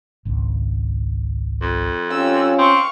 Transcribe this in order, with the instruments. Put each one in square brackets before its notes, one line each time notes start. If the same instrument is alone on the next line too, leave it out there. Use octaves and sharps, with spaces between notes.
[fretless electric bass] G#1 C#2
[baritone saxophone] F2
[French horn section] C#4 F4 [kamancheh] G4 E6
[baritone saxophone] C4 [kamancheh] F5 C#6